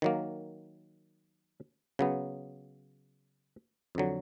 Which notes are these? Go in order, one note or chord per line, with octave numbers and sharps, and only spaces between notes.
D#3 F#3 A#3
C#3 F#3 B3
F2 D3 F#3